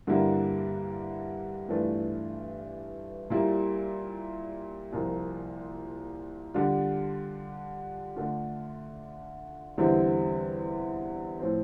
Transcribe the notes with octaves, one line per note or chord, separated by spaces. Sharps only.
G2 D3 G3 A#3 E4
G2 E3 A3 D4 F4
A#2 G3 A#3 E4
C2 A#2 F3 A#3 F4
D3 G3 D4 F4
D3 A3 D4 F4
E2 D3 G3 C4 E4
A2 F3 C4